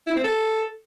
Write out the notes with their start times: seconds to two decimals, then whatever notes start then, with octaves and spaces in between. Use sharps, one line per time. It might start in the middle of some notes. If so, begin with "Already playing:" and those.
0.07 E4
0.15 C4
0.24 A4